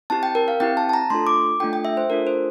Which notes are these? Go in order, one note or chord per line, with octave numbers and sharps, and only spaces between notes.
C4 E4 G4 A5
G5
A#4
F5
C4 E4 G4 G5
A5
A5
A#5
A3 D4 F4 A4 C6
D6
A3 D4 F4 A4 G5
G5
E5
C5
A3 D4 F4 A4 A#4
C5